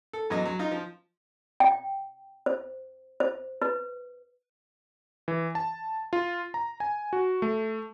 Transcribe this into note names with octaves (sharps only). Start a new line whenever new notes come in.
A4
E2 F#3 D#5
F#3
D#4 F4
F3
G5
C5
C5
B4
E3
A5
F4
A#5
G#5
F#4
A3